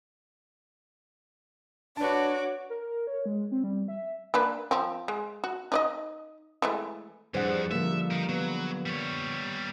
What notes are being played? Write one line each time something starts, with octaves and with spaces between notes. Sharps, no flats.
D4 F#4 B4 C#5 A5 D6
A#4
C#5
G#3
C4
G3
E5
A#3 D4 B4
F3 C4
G#3
F#4
D#4 D5 D#5
E3 G#3 A3
F2 E3 G3 D4 G#4 C5 F#5
D3 F3 G3 A#3 E5
D#4 A#4
F#3 B3
G3 C#5